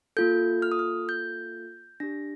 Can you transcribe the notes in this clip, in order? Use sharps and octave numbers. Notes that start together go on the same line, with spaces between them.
A#3 F4 A4 G6
F6
D#6
F6
G6
D4 G4 A#6